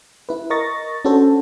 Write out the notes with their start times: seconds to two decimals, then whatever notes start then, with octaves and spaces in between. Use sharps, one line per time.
0.29 E4 B4
0.50 A#4 D#5 C#6 A6 A#6
1.05 C#4 D4 F#4 A4 C5